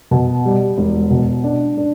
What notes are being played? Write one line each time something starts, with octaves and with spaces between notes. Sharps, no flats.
B2
G3
E1
B2
D4
D4